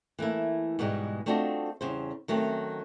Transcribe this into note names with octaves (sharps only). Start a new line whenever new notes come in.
E3 A3 A#3 E4
G#2 B2 E3 F3 G3 G#3
A3 C4 D4 F4 F#4 D#5
E2 C#3 G3 C5
D#3 F#3 A3 C4 C#4